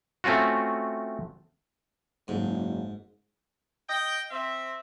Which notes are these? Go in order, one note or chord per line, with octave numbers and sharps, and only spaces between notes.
A3 C4 C#4 F4 F#4
F#1 G#2
D#5 G5
C4 E5